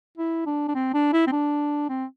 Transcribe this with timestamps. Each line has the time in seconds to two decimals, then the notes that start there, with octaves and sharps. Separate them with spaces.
0.18 E4
0.46 D4
0.68 D4
0.75 C4
0.94 D4
1.13 E4
1.27 C4
1.32 D4
1.89 C4